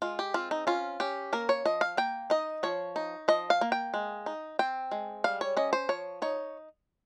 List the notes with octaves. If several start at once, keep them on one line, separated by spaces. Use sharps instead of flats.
G#3 F4
G4
C4 F4
D#4
C#4 F4
C#4 G4
A#3 A#4
C#5
F3 D#5
F5
A#3 G5
D#4 D#5
F3 C#5
D#4
F3 D#5
F5
A#3
G5
G#3
D#4
C4 G5
G#3
G3 F5
C#5
C#4 D#5
C5
F3 C#5
D#4 C#5